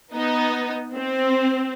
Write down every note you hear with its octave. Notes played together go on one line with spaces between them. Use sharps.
B3 D#4
C4